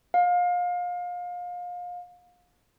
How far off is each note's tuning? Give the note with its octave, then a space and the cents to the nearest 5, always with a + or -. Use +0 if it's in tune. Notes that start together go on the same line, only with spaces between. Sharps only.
F5 +30